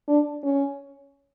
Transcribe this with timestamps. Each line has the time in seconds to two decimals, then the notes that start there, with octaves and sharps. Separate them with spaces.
0.08 D4
0.44 C#4